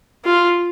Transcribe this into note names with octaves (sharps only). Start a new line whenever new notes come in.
F4